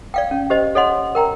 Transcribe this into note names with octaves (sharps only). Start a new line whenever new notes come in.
D5 F5 G5
C#4
G4 C5 D#5
A4 C#5 D#5 F#5 C6
A#4 G5 A#5